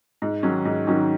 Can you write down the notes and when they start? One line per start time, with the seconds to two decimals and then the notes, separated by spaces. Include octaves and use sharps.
0.22 G#2
0.43 D#3 F#3 C#4
0.65 G#2
0.87 D#3 F#3 C#4